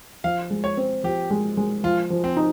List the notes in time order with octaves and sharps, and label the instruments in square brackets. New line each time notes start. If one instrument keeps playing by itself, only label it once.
[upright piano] F3 [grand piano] F5
[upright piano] G#3
[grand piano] C#5
[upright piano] C4
[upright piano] F3 [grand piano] G4
[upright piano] G#3
G#3
[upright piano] F3 [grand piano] F4
[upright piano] F3
[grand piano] C4
[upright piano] D#4